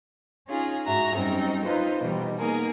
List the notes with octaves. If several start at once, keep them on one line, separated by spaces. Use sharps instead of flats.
C#4 D#4 F4 G#4
G#2 F#4 E5 A#5
F#2 G3 C4 C#4 D#4
D#4 F4 B4 C5
B2 D#3 E3 G3
A#3 B3 D#4 G#4 A#4